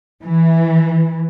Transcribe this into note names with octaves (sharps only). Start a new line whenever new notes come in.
E3